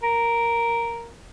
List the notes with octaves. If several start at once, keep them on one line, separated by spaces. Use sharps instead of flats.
A#4